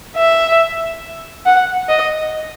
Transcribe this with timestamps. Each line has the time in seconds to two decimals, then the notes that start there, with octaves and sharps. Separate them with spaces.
0.16 E5
1.46 F#5
1.88 D#5